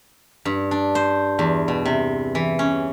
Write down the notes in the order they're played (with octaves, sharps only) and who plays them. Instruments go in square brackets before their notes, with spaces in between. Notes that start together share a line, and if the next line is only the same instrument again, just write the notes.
[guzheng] G2
D4
C5
E2
B2
C3
E3
C#4